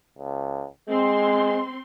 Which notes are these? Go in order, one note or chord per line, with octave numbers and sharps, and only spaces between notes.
C#2
G#3 C4 C6